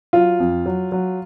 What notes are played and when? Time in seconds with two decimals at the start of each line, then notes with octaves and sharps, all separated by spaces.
0.13 F#3 F4
0.40 F2
0.66 F#3
0.92 F#3